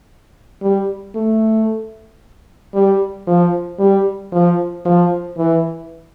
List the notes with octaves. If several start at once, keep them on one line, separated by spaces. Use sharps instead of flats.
G3
A3
G3
F3
G3
F3
F3
E3